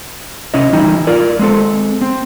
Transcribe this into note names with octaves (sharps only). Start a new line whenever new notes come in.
C3 C#4 E4 D#5
E3 G3 D#4 E4
E4 F4 A#4 D5
G#3 C4 A4
C4